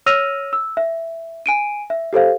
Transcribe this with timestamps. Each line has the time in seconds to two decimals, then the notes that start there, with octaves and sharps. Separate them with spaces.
0.06 C#5 E6 F6 A#6 D#7 F7
0.53 E6
0.77 E5
1.46 G#5 D7 D#7
1.90 E5
2.13 G4 A4 C5 F5